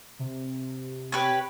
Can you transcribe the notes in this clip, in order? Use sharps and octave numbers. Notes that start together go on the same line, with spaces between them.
C3
G4 B4 C#5